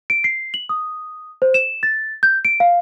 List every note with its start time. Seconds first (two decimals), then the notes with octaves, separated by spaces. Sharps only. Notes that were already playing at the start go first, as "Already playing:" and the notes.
0.10 D7
0.24 C7
0.54 F#7
0.69 D#6
1.42 C5
1.54 E7
1.83 A6
2.23 G6
2.45 D7
2.60 F5